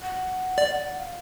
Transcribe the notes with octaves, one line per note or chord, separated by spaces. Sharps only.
F#5
D5
F5